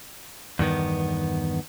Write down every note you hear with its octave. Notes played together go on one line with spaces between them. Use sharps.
E2 G2 D#3 B3